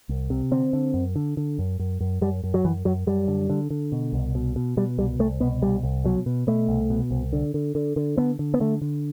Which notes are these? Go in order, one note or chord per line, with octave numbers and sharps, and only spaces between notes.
C2
C3
D3 C4
D3
F#2
D3
D3
F#2
F#2
F#2
F#2 G3
F#2
F#3
F#2 E3
F#2 F#3
F#2 G3
D3
D3
D3
B2
C2
B2
B2
B2 G3
C2 G3
C2 A3
B2 B3
C2 G3
C2
B2 F#3
B2
B2 A3
C2
B2
C2
D3
D3
D3
D3
D3 B3
D3
B3
D3 A3
D3